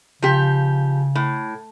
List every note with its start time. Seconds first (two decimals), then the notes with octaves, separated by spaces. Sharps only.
0.22 C#3 F3 G4
1.16 A2